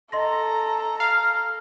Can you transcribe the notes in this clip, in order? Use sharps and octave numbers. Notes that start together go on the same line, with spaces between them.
A4 D#5 A#5 C6 A#6
F5